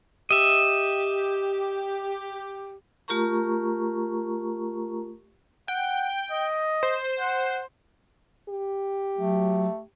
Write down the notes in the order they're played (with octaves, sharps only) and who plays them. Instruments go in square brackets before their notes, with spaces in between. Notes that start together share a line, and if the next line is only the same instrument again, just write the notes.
[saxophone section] G4 [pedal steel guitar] D#5 E5
[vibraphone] A3 F4 G4 A#4 A#5 C#6
[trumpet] F#5 [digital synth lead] G5
[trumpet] D#5
[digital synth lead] C5
[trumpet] F#5
[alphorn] G4
[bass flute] F#3 [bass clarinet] A3